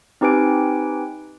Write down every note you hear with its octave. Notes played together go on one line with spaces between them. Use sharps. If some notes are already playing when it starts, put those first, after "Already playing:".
C4 D#4 G4 B4 G#5 D7